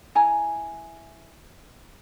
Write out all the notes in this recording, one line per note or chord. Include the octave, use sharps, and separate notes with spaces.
E4 G#5 A#5